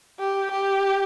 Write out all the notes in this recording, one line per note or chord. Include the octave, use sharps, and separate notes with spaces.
G4
G4